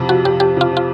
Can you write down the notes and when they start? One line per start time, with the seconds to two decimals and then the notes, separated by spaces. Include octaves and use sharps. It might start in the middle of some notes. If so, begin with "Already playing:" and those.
Already playing: F2 C3
0.09 F3 F#4
0.25 F2 G4
0.40 F2 G4
0.57 C3 F4
0.72 F3 F4